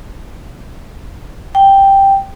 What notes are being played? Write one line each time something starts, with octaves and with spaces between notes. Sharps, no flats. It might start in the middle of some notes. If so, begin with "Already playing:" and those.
G5